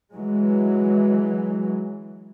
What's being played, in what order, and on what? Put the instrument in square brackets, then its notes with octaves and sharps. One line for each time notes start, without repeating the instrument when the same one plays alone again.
[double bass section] E3 F#3 G#3